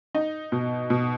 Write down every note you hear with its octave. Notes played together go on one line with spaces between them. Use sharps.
D#4
B2
B2